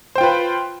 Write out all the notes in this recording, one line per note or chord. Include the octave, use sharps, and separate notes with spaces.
F4 B4 C5 G5